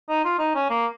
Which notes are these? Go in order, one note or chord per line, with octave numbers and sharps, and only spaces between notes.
D#4
F4
D#4
C#4
A#3